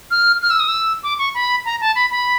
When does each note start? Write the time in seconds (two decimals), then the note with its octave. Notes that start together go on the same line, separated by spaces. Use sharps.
0.11 F6
0.42 F6
0.50 E6
0.60 D#6
0.68 E6
1.03 D6
1.19 C#6
1.34 B5
1.65 A#5
1.81 A5
1.95 B5
2.11 B5